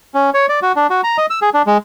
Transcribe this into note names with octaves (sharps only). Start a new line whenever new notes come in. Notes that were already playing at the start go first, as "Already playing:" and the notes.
C#4
C#5
D5
F#4
D4
F#4
A#5
D#5
E6
G#4
D4
G#3